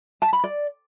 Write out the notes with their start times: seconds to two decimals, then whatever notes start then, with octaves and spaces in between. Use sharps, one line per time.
0.22 A5
0.33 B5
0.44 D5